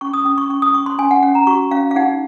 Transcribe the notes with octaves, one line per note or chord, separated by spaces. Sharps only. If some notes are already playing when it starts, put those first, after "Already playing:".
C#4 C#6
D#6
C#4 D#6
C#6
C#4 C#6
D#6
C#4 C#6
C6
C#4 G#5
F#5
C#4 F#5
A#5
F#4 C#6
C#4 F5
F5
D#4 F#5